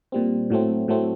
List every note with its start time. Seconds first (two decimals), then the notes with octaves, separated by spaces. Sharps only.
0.12 A#2 G3 C4
0.50 A2 F#3 A3 C4
0.88 A2 F#3 A3 C4